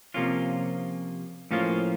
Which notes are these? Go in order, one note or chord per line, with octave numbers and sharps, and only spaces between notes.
C3 F3 A#3 C#4 F4
A2 F3 A#3 C#4 F4